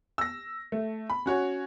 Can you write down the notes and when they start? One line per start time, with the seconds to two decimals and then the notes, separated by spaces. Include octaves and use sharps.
0.18 E6 A#6
0.72 A3
1.10 B5
1.26 C#4 F#4 C#5